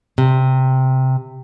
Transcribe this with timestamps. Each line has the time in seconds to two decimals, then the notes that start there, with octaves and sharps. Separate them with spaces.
0.18 C3